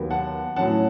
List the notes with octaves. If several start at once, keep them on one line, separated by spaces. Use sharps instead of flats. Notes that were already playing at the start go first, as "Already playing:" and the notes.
Already playing: D#2 D#3 F#3 B3
F#5 A5
A2 F#3 C#4 F#5 A5